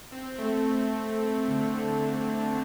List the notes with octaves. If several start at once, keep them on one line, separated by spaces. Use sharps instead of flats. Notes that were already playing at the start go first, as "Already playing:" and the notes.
C4
A3
A3
C4
A3
D3
D3
D3
D3